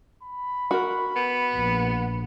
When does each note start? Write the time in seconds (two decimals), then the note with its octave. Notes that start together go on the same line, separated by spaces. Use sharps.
0.23 B5
0.71 F#4 A#4
1.16 B3
1.54 A#1